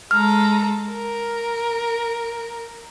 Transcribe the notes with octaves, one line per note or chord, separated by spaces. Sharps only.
G#3 A4 A#5 F6
A#4